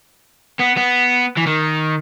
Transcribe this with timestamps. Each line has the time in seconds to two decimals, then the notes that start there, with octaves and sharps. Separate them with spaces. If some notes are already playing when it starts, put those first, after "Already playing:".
0.60 B3
0.77 B3
1.37 E3
1.46 D#3